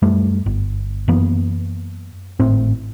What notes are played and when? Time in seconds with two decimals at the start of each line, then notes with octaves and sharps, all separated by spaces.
0.02 F#2 G3 A3
0.46 G1
1.08 F#2 E3 A#3 B3
2.40 G#1 A2 C4